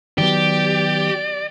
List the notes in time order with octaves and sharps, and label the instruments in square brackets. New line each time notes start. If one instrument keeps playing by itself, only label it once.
[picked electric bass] D#3 F#3 B3 [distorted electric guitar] G4 [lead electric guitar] D5